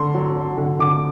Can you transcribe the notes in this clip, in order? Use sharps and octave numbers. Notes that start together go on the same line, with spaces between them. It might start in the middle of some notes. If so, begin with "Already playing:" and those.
Already playing: D3 C6
F#3
F#3
D3
D3 D6